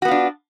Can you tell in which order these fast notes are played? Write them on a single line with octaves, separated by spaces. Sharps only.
F#4 B3 F4 D4